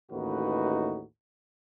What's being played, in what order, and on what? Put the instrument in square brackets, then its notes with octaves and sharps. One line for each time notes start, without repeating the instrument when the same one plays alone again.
[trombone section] A1 D#2 A2 D#4 F#4 B4